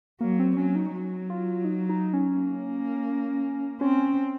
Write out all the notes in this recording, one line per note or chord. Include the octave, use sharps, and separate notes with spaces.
F#3 A#3
C4
F#3 C#4
D#4
F#3
F4
D#4
D#4
C#4
A#3
C4 C#4